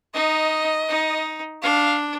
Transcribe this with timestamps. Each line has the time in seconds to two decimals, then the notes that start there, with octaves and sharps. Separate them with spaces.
0.14 D#4 D#5
0.89 D#4
1.63 D4 F5